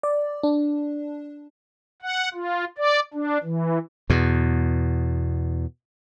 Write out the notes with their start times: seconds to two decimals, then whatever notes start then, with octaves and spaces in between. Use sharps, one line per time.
0.03 D5
0.43 D4
2.02 F#5
2.34 F4
2.78 D5
3.14 D4
3.43 E3
4.10 E2 B2